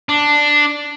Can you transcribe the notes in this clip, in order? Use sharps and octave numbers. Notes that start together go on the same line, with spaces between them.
D4